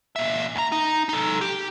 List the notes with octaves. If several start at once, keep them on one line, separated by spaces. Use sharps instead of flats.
A#2 E5
D2 A#5
D#4
D#4 A4
G4